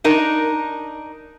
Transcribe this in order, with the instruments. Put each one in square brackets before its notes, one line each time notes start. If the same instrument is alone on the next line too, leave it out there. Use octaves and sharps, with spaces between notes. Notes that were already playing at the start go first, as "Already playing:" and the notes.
[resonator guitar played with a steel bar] D4 D#4 A#4